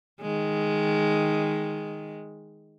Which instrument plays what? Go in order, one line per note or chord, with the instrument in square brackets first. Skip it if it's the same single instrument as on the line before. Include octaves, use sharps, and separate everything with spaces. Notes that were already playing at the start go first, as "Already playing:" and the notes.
[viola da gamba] D#3 G#3